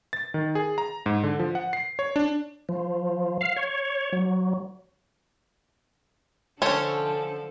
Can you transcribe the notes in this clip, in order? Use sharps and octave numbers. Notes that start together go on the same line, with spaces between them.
A6
D#3
G#4
A#5
G#2
D3
F3
F#5
C7
C#5
D4
F3
F5
C#5
F#3
D3 F3 A3 C#4 A4 C5 C#5